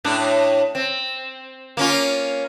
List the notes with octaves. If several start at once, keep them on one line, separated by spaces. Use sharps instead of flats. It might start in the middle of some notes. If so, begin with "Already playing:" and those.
A2 D4
C4
A#3 C#4 F4